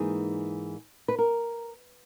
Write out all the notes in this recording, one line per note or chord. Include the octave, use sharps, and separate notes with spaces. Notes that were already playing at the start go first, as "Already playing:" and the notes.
Already playing: G#2 E3 A#3 D#4 G#4
B4
A#4